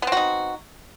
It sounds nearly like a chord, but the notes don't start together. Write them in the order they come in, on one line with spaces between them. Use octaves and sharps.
B3 C4 F#4 D#4